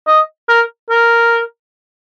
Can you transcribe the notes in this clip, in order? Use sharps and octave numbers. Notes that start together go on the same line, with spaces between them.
D#5
A#4
A#4